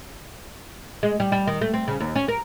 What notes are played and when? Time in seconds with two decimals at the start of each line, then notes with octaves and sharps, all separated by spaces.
1.03 G#3
1.20 G3
1.32 G3
1.47 D#3
1.61 A3
1.73 C4
1.88 C#3
2.00 D#2
2.15 C#4
2.28 A#4